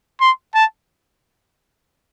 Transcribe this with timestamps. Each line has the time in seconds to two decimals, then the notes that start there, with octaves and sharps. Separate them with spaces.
0.21 C6
0.55 A5